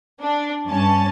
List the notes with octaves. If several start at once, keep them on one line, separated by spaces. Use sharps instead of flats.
D4
G2 C#4 A5